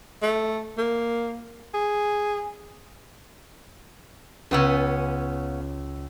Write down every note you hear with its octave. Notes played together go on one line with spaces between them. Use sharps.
A3
A#3
G#4
C#2 C#3 B3 C#4 E6